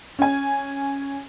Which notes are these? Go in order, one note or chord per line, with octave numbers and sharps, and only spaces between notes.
C#4 G#5